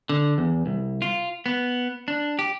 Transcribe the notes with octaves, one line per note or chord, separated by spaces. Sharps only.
D3
E2
C2
F4
B3
D4
G4